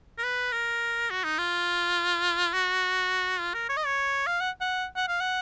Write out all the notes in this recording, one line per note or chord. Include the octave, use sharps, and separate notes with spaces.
A#4
B4
A#4
F#4
D#4
F4
F#4
F4
A#4
C#5
D#5
C#5
F5
F#5
F#5
F#5
F5
F#5